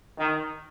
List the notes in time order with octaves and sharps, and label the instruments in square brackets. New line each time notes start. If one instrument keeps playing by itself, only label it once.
[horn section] D#3